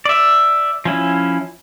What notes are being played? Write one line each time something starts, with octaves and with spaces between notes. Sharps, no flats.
D5 E5
F3 C#4 E4